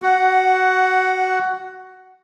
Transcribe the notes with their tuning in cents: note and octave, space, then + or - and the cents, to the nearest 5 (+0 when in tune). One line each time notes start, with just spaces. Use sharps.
F#4 +15 F#5 +0